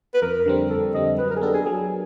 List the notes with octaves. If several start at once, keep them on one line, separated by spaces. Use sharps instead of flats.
B4
F2 A#4
D3 G3 C4
F2 A4
D3 G3 C4 D#5
F#3 B4
A#4
G#4
B3 D4 G4 A4 A#4
G#4
F#3 G#4